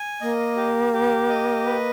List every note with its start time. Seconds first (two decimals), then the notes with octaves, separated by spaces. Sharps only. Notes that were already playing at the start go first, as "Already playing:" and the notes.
Already playing: G#5
0.21 A#3 D#5
0.57 G4
0.93 G4
1.29 D#5
1.65 B4